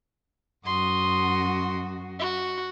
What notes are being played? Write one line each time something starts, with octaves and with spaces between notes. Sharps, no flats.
F#2 F#4 C6 D#6
F#4